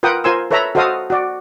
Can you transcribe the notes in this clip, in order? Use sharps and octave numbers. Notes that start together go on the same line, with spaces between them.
F4 A#4 B4 F#5 G5 D#6
F4 A#4 C5 G#5 C6 E6
A4 B4 C#5 E5 A#5 B5
F#4 A4 C5 D#5 F5 D#6
F#4 D5